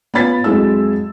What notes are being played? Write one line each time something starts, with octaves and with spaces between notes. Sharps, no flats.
B3 C#4 F4 B5 A6 B6
F2 F#3 G#3 E4 E6